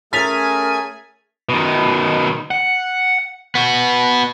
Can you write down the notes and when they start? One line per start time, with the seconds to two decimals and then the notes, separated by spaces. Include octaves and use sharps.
0.13 A3 C#4 G#4 A#4 G#5 A6 B6 F7
1.49 B2 D#3
2.51 F#5
3.55 B3 F#4